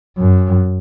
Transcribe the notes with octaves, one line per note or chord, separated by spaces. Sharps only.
F#2